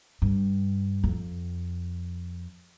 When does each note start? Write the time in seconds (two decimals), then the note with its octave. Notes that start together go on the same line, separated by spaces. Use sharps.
0.22 G2
1.04 F2